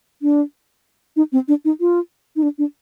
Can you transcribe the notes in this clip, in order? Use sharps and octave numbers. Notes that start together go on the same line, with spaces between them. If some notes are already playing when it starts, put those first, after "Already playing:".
D4
D#4
C4
D4
D#4
F4
D#4
D4
D4